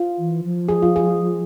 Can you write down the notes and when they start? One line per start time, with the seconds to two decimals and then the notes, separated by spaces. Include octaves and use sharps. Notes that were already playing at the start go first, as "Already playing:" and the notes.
Already playing: F4
0.18 E3
0.44 F3
0.69 G#4
0.82 F4
0.96 G#4